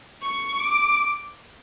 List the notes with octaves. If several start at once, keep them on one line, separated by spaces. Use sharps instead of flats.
C#6
D6